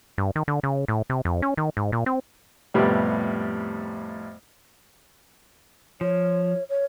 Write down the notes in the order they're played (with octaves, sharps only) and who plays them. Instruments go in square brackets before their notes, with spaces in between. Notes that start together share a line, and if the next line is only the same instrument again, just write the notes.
[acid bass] G2
D#3
D3
C#3
A2
C3
F2
C#4
D#3
G#2
A#2
C4
[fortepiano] F2 A2 C3 G3 B3
[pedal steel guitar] F3 [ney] C#5
[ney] C#5